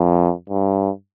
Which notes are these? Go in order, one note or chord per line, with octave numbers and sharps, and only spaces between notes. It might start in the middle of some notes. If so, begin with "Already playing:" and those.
Already playing: F2
G2